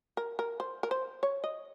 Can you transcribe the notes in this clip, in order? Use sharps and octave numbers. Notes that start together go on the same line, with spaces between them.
A#4
A#4
C5
A#4
C5
C#5
D#5